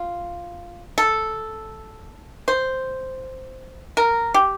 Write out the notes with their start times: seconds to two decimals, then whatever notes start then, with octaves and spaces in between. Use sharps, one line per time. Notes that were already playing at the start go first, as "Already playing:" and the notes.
Already playing: F4
0.98 A4
2.48 C5
3.97 A#4
4.34 G4